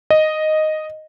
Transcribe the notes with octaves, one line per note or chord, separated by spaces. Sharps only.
D#5